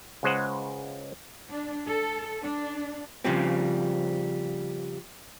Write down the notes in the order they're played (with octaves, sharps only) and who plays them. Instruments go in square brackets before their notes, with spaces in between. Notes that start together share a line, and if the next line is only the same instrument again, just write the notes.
[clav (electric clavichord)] C#2 C#3 G#3 C5 D#5 F#5
[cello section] D4
A4
D4
[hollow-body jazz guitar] C#3 F3 G3 C4